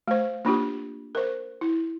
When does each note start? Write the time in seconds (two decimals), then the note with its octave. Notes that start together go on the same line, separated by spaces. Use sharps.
0.08 A3 C5
0.45 A#3 D4 F4 G4
1.15 A#4 C5
1.61 E4